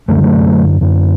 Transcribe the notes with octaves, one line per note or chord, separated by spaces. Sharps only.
F#2 D3 A3
G3
F#3 A3
F#2 D3